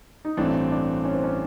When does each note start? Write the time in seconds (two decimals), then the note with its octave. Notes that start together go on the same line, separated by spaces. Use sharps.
0.25 D#4
0.37 A1 G2 E3 A3 C4 D4
0.71 D4
1.05 C#4
1.14 C4
1.24 C#4